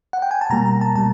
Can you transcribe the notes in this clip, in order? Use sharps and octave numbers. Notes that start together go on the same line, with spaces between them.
F#5
G5
G#5
A5
B2 G3 A#3 A#5
A#5
A5
B2 G3 A5